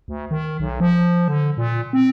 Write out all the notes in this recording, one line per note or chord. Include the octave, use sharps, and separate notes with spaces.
D2
D#3
B1
F3
D3
A#2
C4